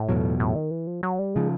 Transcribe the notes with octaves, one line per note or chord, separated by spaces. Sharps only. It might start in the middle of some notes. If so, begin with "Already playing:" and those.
Already playing: A2
E2 B2 F#3
A2
D#3
E3
F3
F#3
G3
C#3 F3 G#3